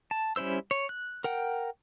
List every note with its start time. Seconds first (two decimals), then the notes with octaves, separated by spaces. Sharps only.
0.11 A5
0.36 G3 C#4 E4 C5 E6
0.71 C#5
0.89 F#6
1.24 A#4 F#5 G5